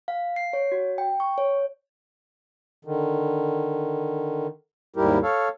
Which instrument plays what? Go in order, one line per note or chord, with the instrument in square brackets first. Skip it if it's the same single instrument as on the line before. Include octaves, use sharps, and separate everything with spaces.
[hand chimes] F5
C7
C#5
F#4
G5
C#6
C#5
[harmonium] D3 D#3
D#2 G#2 G3 E4 G4 A#4
A4 C#5 F5